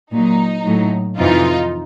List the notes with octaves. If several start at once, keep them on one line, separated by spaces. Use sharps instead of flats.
A#2 F#3 D#4
A2 F#3
F2 C3 E3 D#4 F4